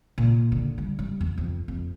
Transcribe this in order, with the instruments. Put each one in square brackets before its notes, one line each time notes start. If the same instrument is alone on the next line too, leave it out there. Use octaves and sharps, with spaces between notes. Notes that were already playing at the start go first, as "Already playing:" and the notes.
[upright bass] A#2
D3
G3
G3
E2
F2
F2